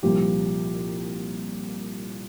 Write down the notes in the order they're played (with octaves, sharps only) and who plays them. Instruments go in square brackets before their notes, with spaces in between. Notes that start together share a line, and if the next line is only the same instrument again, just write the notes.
[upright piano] C2 A#2 F3 G4